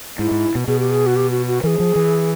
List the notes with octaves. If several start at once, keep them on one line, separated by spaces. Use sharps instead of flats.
G#2 E4
G#2
B2
B2 G#4
G4
G#4
F#4
G4
F#4
F#4
E3 G#4 A#4
F3
E3